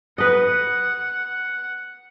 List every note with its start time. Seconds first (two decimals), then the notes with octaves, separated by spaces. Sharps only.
0.18 B4 D#5 F#5